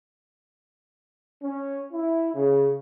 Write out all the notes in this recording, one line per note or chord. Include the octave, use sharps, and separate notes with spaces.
C#4
E4
C#3